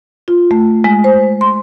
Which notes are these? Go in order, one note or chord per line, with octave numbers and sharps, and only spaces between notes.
F4
A3
G#3
C5
C6